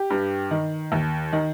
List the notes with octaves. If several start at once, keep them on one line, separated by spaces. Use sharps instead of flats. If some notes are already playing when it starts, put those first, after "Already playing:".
Already playing: G4
G2
D#3
D#2
D#3